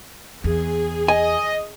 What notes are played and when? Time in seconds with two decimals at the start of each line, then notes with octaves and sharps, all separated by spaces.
0.44 E2 G#4
1.08 D#5 G#5